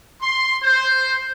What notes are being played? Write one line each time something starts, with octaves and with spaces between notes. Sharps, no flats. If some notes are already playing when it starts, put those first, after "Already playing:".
C6
C5